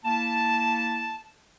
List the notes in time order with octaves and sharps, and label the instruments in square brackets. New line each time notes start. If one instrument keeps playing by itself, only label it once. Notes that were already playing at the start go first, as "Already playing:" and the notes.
[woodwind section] A#3 E4 A5